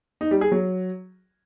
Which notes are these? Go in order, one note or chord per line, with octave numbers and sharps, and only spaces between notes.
D#4
G3
G#4
F#3